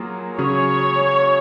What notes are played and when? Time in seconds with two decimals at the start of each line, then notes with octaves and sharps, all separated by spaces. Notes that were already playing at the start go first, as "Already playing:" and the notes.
Already playing: F#3 A#3 F4 G#4
0.38 C#3 F#3 C#4 G#4 C#5